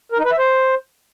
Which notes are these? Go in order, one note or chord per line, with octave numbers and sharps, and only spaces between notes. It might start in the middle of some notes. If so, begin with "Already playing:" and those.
A#4
D#4
B4
E5
C5